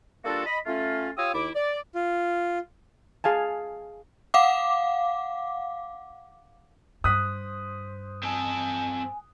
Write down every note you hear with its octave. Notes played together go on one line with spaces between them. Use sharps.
G3 A#3 D4 F4 F#4 A4
D#5 B5
A3 C#4 F4
F4 G4 C#5 F5 D#6 E6
D#2 E4 D6
D5
F4
G#4 F5 G#5 A5
F5 F#5 D6
G2 C5 D#6 F#6 B6
C4 A4 G#5